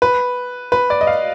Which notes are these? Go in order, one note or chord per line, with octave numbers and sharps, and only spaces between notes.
B4
B4
D5
D#5
F5